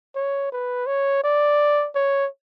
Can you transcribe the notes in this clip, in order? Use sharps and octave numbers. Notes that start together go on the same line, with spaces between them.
C#5
B4
C#5
D5
C#5